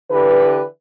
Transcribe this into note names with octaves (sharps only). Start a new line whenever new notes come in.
D3 E3 G4 B4